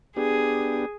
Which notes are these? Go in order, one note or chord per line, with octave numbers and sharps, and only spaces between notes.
B3 D4 G4 G#4